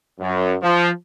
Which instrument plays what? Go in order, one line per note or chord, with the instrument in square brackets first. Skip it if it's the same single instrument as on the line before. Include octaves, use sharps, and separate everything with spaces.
[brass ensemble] F#2
F3